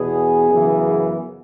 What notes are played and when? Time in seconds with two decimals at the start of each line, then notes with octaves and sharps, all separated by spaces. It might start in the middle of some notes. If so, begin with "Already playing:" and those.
Already playing: E2 B2 B3 G#4
0.49 F#2 C#3 E3 B3